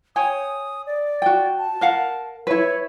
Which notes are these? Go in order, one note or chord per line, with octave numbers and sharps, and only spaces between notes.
C#5 G5 G#5 D#6
D5
F#4 G5
A5
A#4 F5 F#5
E4 B4 C#5